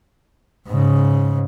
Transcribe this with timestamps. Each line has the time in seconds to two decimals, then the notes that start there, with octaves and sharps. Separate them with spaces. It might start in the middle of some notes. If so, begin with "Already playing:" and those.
0.68 G#2 C#3